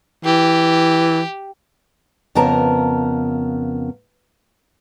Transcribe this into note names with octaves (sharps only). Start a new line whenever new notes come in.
E3 G4
F2 C#3 B3 A#4 A5 A#5